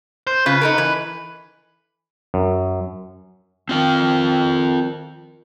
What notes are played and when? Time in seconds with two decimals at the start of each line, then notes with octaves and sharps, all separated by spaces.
0.27 C5
0.46 C#3 F4 B4
0.61 D#4 A4 A#4
0.78 E3
2.34 F#2
3.69 D#3 C4 F4 G5